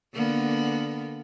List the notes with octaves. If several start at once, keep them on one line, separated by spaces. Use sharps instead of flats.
D3 A#3 B3